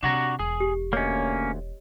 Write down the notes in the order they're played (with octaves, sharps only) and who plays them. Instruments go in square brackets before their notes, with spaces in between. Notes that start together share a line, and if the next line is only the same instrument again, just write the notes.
[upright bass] C3 [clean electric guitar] D4 F#4 A#5
[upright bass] E1 [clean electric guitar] G#4
[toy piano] G4
[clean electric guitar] D2 [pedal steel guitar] A#3 C#4 [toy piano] C#5 D#5